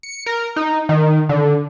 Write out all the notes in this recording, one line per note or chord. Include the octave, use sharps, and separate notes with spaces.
C#7
A#4
D#4
D#3
D3